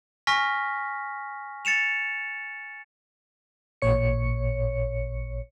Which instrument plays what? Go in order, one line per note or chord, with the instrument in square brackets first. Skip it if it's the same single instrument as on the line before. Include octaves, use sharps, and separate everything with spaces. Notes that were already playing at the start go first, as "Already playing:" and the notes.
[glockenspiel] G#5 C#6 F6 A#6 B6
A6 C#7 E7 F7
[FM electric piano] A1 A#2 C#5 C#7